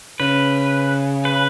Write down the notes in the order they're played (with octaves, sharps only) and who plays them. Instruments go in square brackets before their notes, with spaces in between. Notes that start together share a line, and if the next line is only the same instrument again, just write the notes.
[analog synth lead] C#3 [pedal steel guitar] B4
[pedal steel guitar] B4